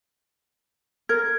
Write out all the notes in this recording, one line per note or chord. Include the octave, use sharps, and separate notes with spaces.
A#4 G#6